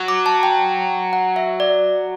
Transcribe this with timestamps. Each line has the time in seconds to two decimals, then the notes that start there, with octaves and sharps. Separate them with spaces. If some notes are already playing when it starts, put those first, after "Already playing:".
Already playing: F#3
0.08 D6
0.26 A5
0.43 G5
1.13 F#5
1.36 E5
1.60 D5